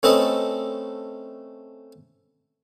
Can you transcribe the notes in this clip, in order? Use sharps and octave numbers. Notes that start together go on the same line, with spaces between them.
A3 C4 C#4 A4 B4 D#5